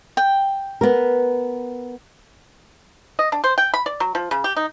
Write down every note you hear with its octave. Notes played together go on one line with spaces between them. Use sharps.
G5
B3 A#4
D#5
D4
C5
G5
B5
D5
F#3
F3
C#3
G4
D#4